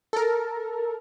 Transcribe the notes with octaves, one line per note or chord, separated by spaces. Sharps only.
A4 A#4